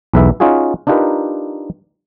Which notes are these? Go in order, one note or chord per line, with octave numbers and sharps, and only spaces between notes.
B1 E2 B4 E5
C#4 D#4 F4 F#4 G#4
D4 D#4 F4 G4 A#4 B4